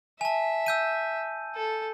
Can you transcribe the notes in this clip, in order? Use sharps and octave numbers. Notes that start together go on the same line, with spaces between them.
E5 G#5 A5
E6 G6 D#7
A4